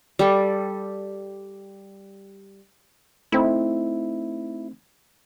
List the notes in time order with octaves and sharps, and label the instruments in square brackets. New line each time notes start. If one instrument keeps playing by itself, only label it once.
[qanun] G3 A4
[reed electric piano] A3 C4 D#4 [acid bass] E4